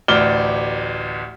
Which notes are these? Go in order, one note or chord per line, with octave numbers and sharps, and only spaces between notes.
A1 D2 D5 D6 F6 G7